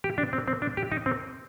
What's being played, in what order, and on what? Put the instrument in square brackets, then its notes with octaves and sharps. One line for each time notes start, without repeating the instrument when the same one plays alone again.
[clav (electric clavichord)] G4
D4
C4
C4
D4
G4
D#4
C4